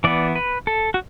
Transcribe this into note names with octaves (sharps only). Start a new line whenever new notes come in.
E3 B3 D5
B4
A4
F#4